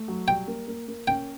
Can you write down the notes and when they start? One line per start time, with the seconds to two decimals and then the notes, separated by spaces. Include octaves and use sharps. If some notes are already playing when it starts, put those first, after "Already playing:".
Already playing: A3
0.08 F#3
0.28 G3 G5
0.48 A#3
0.68 A#3
0.88 A#3
1.07 C#4 G5